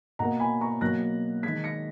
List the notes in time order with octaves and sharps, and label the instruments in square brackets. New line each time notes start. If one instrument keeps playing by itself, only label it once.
[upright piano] B2 A#3 F#5 A#5
G#5 B5
A#5 C#6
B2 F#3 A#3 F#6 A#6
D#3 G#3 G#6 B6
A#6 C#7